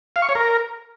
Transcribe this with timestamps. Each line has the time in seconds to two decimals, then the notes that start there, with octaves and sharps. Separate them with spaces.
0.16 F5
0.22 C#6
0.29 C#5
0.35 A#4